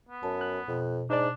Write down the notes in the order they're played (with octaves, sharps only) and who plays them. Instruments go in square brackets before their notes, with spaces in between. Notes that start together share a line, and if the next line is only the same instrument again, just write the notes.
[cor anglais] B3
[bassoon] F#2 [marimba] A5
[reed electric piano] F#6
[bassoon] F2 [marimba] B2
[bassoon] G#2 [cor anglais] D4 [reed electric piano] D#4 D5